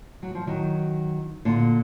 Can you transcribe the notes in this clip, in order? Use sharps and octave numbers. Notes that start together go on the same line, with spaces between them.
F#3
F3
D#3 F#3
A#2 D3